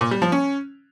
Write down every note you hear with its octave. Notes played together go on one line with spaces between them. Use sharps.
A#2
G3
F3
C#4